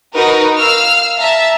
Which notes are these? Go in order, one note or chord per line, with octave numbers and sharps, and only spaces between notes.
D#4 F#4 A#4 B4
F5 E6 F6
E5 A5 A#5